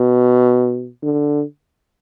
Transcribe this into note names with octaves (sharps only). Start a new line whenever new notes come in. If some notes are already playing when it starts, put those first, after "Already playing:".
Already playing: B2
D3